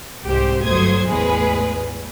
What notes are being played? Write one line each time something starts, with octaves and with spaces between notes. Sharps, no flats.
C2 G#2 G4 C5
G1 F#3 A3 C5 D#6 G#6
A1 E2 G#3 G#4 B4